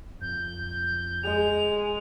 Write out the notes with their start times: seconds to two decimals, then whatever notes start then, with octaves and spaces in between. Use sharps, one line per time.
0.21 F2 G6
1.23 G#3 F7